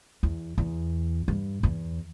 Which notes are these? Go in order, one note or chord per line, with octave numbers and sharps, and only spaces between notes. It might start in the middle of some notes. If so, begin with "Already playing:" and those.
E2
E2
G2
E2